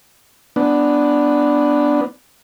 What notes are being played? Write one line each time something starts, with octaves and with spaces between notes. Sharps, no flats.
B3 D4